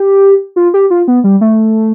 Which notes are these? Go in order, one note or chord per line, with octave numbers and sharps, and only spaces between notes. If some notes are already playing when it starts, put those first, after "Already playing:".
Already playing: G4
F4
G4
F4
B3
G3
A3